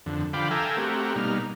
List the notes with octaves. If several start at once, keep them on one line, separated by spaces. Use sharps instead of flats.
F2 D3
D3 F3 F5 G5 B5 D6
A4 E5 F5 G5 G#5 A#5
A3 C4 F#4 G4 A#4
B2 G3 A#3 D#4 F6